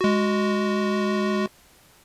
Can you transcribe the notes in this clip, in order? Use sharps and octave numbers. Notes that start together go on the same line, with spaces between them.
G#3 F#4